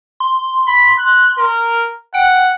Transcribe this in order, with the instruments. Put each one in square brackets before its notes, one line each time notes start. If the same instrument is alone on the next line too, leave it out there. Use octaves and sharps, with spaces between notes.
[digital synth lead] C6
[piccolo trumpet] B5
F#6
A#4
[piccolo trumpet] F#5 [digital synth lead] G5